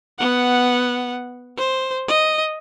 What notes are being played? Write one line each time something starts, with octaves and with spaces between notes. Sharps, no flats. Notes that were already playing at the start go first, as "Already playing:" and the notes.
B3 F#5
C5
D#5